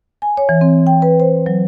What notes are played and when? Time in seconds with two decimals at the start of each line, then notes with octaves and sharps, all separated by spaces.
0.22 G#5
0.37 C#5
0.49 E3
0.61 C4
0.87 G5
1.02 B4
1.20 C5
1.46 F#3